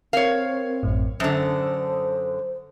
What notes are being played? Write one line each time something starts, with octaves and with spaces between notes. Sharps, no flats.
C4 A#4 C#5 F5
A1 F#2 A2
F#2 D3 C5 A5 D#6